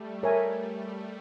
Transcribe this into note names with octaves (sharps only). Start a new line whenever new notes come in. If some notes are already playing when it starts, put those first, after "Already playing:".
Already playing: G3 A3
A#4 C#5 E5 G#5